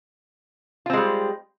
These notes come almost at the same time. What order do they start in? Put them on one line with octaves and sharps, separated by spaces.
F4 C4 G#3 G3